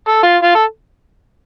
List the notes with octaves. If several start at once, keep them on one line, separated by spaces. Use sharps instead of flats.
A4
F4
F4
A4